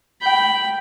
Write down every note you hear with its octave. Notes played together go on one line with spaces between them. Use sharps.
G5 B5